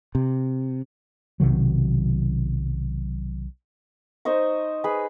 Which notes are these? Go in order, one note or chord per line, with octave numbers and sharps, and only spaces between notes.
C3
B1 C3 D#3 F#3
D#4 C5 D#5 C#6
G#4 B4 B5